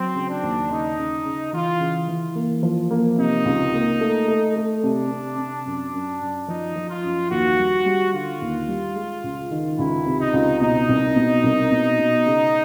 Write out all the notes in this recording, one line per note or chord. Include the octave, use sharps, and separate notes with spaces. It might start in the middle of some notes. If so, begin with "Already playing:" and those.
Already playing: F#3 C4
C#3
D4
D#2
C#3 D#4
C#3
C#3
E3 F4
C#3
E3
A#3
F3
A#3
C3 D#4
C#2
A#3
A3
A3
A3
C3 D4
C3
C3
F#2
F#2
F#2
F3 D#4
F3
F4
F#2
D#2 F#4
G3
G3
D3 F4
D#2
G3
G#3
C#2
D#3
C#2 E4
C3
D#4
C#2
B2 D#4
C2
B2
C2
B2
B2
C#3